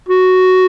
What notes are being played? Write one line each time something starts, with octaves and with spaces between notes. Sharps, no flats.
F#4